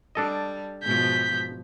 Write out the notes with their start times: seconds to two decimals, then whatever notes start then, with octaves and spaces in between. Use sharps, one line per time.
0.15 G3 D4 A4 D#5
0.83 G#2 B2 F3 G6 B6